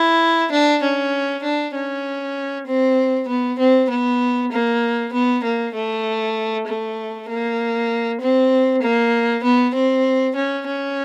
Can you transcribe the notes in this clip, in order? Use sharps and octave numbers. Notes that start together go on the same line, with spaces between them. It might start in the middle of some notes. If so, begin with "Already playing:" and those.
Already playing: E4
D4
C#4
D4
C#4
C4
B3
C4
B3
A#3
B3
A#3
A3
A3
A#3
C4
A#3
B3
C4
C#4
C#4